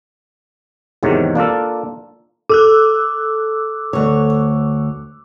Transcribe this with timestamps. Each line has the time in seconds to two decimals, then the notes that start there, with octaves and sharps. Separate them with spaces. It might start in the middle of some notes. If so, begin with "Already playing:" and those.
1.03 E2 G#2 C3 D#3 F#3
1.35 A#3 D4 F4 A4
2.49 A4 D6 E6 F#6
3.93 D2 C#5